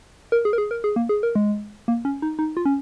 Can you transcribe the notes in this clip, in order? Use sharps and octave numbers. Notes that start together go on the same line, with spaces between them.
A#4
G#4
A#4
G#4
A#4
G#4
A#3
G#4
A#4
G#3
A#3
C#4
D#4
D#4
F4
C#4